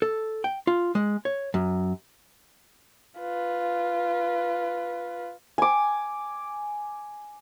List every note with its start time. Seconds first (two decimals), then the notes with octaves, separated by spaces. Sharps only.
0.02 A4
0.44 G5
0.67 F4
0.95 G#3
1.25 C#5
1.54 F#2
3.20 F4 B4
5.58 G#5 D6